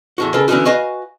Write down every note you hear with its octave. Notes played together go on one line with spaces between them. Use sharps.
E2 A2 F#4
C#3 A#3 A4 B4
D3 E3 B3 C#4 D#4 F#4
F#4 B4 D#5 F5 G#5